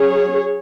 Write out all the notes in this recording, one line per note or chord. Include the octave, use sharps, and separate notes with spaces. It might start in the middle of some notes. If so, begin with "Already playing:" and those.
Already playing: F#3 C#4 G#4 C#5